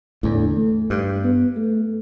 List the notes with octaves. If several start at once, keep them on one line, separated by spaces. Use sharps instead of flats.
E2 A2 D3
A3
G2
B3
A3